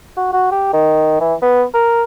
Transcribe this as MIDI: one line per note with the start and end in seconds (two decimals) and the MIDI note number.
0.17 0.29 66
0.33 0.50 66
0.52 0.69 67
0.73 1.16 51
1.21 1.34 52
1.42 1.64 59
1.74 2.03 70